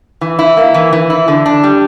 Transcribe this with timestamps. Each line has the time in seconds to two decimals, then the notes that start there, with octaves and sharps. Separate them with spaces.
0.21 E3
0.39 E4
0.57 A#3
0.74 E3
0.93 E3
1.10 E4
1.28 D3
1.46 D4
1.64 G3